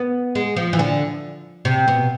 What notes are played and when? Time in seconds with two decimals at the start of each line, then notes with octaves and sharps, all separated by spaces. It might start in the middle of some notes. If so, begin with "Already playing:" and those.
Already playing: B3
0.35 G#3
0.56 F3
0.73 E3
0.79 D3
1.65 C3
1.88 B2